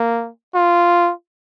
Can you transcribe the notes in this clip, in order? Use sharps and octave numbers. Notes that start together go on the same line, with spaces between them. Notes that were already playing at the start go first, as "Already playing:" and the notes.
Already playing: A#3
F4